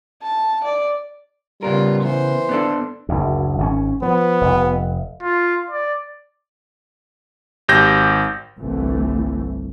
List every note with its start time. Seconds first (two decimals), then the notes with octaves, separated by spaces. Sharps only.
0.23 A5
0.64 D5
1.63 C#3 G3 B3 F4 A#4
2.03 E3 C5
2.49 B3 D4 A4
3.09 F#1 D2
3.58 G#1 D3 C#4
4.02 F3 B3
4.41 F1
5.22 F4
5.70 D5
7.68 G#1 G4 G6 A#6
8.58 G1 C2 E3 A3